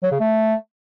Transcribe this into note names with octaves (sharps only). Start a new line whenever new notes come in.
F#3
C#3
A3